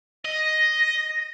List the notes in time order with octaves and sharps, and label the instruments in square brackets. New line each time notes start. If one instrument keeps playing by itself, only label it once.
[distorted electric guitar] D#5 [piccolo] A#6